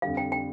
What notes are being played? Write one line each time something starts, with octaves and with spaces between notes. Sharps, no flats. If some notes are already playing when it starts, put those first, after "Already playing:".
F2 D3 G3 F5
G5
G5